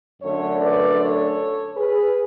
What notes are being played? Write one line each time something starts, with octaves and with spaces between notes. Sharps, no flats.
F#2 D3 A3 A4 C#5
B4 D5
A4 C#5
G#4 B4